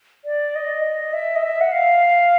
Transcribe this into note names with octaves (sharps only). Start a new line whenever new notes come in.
D5
D#5
D#5
E5
D#5
E5
F#5
F5